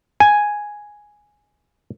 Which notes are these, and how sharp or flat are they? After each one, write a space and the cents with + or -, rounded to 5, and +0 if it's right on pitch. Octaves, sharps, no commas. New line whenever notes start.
G#5 +0